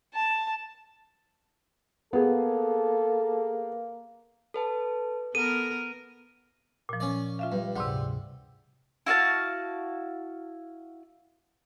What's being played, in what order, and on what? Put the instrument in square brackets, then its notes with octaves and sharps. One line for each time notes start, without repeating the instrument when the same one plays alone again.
[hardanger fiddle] A5
[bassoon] A#3 [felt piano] B3 G#4 [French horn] A4
[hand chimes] A4 B4 A5
[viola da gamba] B3 A#4 [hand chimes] A4 [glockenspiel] D#7
[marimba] A#2 F3
[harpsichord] C#4 D5
[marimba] F4 E5 F5
[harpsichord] G2
[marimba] D2 G#2 C3 [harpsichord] G3
[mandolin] E4 F#4 F5 A5